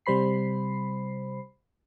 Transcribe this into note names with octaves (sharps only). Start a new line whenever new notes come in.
C3 G3 C5 B5 C7